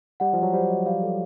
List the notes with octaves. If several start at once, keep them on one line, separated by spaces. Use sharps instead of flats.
G3 F#5
F3 D#5
F#3
G3 C5
D#5
G3 F5
A4